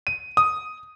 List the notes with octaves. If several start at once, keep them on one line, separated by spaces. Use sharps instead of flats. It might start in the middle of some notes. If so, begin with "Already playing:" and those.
D#7
D#6